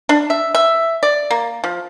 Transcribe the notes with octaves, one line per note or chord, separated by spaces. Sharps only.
D4
E5
E5
D5
A#3
F3